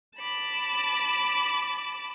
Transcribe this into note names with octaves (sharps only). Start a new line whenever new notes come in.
A5 B5 D6